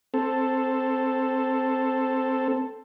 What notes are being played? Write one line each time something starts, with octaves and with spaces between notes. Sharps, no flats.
C4 A4